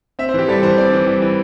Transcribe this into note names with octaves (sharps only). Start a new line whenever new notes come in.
C4 E5
C5
E3 G4
G3 A4
E3 C5
C4 D5
E3
G3
E3